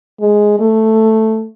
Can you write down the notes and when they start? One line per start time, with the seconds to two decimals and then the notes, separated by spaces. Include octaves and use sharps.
0.21 G#3
0.59 A3